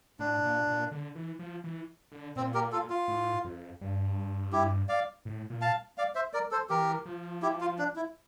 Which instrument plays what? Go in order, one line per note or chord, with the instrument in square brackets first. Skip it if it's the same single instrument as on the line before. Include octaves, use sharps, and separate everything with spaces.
[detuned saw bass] A2 [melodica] D4
[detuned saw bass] A#2
A#2
D3
E3
F3
E3
D3
[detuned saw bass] A#2 [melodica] C4
[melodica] G4 A#4
F4 A4
F4
[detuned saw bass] A2
F2
G2
[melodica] E4 G4
D5 F5
[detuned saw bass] A2
A#2
[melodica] F5 A5
D5 F5
C5 E5
A#4 D5
A4 C5
[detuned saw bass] E3 [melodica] G4 A#4
[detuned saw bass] F3
[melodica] E4 G4
F4
D4
E4